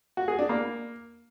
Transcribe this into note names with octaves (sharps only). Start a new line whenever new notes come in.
F#4
G#4
D4
A#3